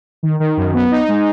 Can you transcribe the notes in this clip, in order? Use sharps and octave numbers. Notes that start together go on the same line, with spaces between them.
D#3
D#3
F#2
B3
D#4
G#3